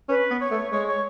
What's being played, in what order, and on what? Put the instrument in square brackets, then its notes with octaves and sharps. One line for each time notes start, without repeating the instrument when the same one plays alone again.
[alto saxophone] C#4 [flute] B4
[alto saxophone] B3
[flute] C#5
[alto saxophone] A3
[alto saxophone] G#3 [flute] C#5
[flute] C#5